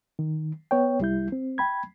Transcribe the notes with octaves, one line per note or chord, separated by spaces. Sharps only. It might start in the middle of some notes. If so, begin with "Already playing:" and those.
D#3
B3 C#5 G5
C2 G3 E4 G6
C4
G5 B5 G#6